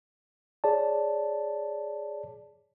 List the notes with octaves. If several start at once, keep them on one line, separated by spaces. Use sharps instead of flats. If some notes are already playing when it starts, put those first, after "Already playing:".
G#4 C#5 D5 A5